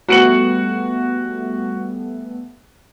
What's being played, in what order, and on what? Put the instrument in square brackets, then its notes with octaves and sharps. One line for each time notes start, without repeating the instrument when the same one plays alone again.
[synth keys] G3 A3 B3 [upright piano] F#4 C#7 F#7